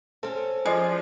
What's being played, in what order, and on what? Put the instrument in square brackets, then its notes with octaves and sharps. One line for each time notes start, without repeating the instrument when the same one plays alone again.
[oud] C4 C#4 [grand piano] A4
[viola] F3 [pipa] G#3 [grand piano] D5 C7